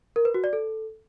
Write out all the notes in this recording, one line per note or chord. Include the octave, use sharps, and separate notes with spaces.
A#4
B4
F#4
D5
A4